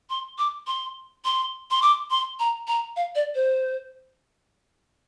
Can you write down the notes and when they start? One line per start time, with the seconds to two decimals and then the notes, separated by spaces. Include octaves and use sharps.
0.10 C6
0.38 D6
0.67 C6
1.25 C6
1.71 C6
1.82 D6
2.11 C6
2.40 A#5
2.68 A#5
2.96 F5
3.15 D5
3.35 C5